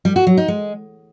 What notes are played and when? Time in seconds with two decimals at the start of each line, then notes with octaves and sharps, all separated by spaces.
0.05 G3
0.16 F#4
0.27 F#3
0.37 D#4
0.48 G#3